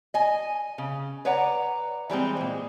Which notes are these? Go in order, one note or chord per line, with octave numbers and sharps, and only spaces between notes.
D#5 G#5
C#3
B4 C#5 D5 F#5 A#5
E3 G3 G#3 C4
A#2 G#3